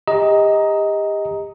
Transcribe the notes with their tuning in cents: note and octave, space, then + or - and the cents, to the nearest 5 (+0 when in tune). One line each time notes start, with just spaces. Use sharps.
G4 +35 D#5 +15 A#5 +0